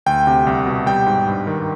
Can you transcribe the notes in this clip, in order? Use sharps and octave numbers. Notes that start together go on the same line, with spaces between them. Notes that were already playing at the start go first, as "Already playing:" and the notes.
D2 G5
C3
C2
B2
G3 G5
G#2
G2
D#3